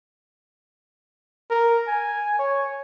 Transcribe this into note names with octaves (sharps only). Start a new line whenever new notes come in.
A#4
G#5
C#5